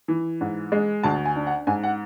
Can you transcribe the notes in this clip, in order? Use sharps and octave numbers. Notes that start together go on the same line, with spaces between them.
E3
G#2
G#3
D2 A5
G#5
D4
F#5
G#2 G#5
F#5